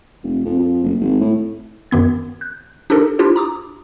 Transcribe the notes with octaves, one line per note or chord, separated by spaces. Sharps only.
F1
F2
F2
F#1
G#1
A2
F#2 D#3 B3 G#6
F#6 G6
D4 D#4 G4 A4 A#4
D4 E4 F4 G4 C5
A#5 D6 D#6